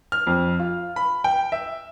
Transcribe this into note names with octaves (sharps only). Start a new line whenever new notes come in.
F6
F2
F4
B5
G5
E5